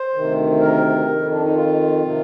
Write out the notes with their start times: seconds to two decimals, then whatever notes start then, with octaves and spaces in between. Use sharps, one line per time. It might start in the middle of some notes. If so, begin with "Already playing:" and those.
Already playing: C5
0.14 D2 C3 D#3
0.61 A#4
1.08 F2 D#3
1.31 D4
1.43 D#4
1.55 F4
2.04 C3 D#3